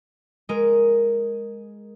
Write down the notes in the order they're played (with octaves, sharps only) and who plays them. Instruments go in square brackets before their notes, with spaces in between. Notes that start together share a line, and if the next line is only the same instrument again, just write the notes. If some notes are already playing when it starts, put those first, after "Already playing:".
[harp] G#3 G#4 A#4